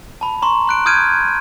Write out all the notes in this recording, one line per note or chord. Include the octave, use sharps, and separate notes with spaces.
A5 B5
A#5 C6 C#6
C6 F#6 D7
D#6 F6 G6 G#6 D7 D#7